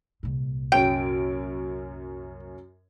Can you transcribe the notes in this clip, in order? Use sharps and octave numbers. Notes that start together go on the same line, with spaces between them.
C2 A#2
F#2 C#4 G5 D7